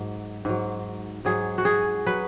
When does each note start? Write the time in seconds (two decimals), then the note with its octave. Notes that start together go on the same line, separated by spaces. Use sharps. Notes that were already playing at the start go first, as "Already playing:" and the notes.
Already playing: G#2 F#3
0.45 G#2 F#3
1.25 G#2 F#3 G#4
1.58 F#4
1.65 G#4
2.06 F#3 B4